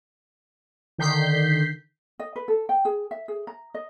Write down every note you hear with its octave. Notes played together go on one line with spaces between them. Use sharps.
D3 D#3 G6 B6 C7
D#5
B4
A4
G5
G#4
E5
G#4
A#5
D#5